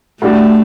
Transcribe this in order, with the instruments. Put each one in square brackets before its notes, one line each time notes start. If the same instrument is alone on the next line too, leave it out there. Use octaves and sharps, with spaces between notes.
[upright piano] A2 G3 D4 F#4 [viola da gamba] A3